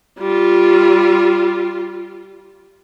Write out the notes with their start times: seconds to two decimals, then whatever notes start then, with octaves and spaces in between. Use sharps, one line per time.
0.19 G3 F4